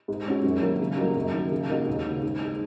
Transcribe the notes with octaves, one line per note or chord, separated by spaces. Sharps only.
G#2
G#3 C#4 F#4
F#2
D#3 F#3 A#3
C#3
F#3 A#3 D#4 F#4
F#2
D#3 A#3 F#4
C#3
A#3 D#4 F#4
D#2
C#3 G#3
G#2
G#3 D#4